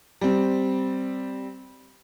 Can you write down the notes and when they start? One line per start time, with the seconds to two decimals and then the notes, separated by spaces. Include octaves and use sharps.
0.21 G3 C4